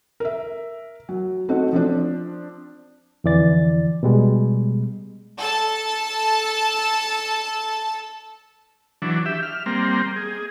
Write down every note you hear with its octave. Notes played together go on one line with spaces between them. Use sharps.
A#4 E5
F#3
A3 C4 D#4 F#4
F3 C4 D4
F2 D3 E3 D5 A6
B2 G3 G#3
A4 A5
E3 F#3 D4
G4 E5
F6
G3 A#3 C4
G#4